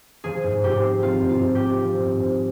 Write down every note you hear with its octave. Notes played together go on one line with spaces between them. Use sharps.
F3 G#4
G#2
G#2 G4
C4
F3 F4
G#2
F4
G#2
G4
C4
F3
G#2
G#2